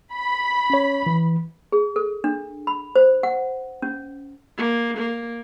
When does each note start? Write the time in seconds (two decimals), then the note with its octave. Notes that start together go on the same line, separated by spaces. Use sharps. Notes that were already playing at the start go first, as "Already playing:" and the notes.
0.14 B5
0.70 C#4 C#5
1.06 E3
1.72 G#4
1.96 A4
2.24 D4
2.67 B5
2.96 C5
3.23 F#5
3.82 C#4
4.57 A#3
4.97 A#3